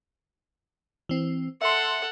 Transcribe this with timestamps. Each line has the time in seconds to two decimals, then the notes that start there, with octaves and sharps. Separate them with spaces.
1.09 E3 C4
1.61 A4 E5 F#5 C6